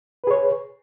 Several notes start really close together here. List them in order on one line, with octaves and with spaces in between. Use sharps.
B4 G#4 C#5